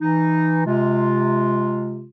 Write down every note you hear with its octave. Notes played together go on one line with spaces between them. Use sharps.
E3 D#4
C3 G#3 F4